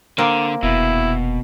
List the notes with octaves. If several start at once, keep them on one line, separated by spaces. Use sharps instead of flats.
D3 A#3 C4 A#4
F1 B2 E4